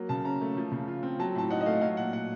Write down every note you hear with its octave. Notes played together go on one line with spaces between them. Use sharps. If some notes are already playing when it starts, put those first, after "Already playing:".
Already playing: F#3 A#3
C#3 A5
C#4 A#5
A3
F3
C#3
F4
C4
F#3 A5
A2 A5
D#4 F#5
D#5
A3 F5
F#3 F5
A#2 F#5
A#2 F#5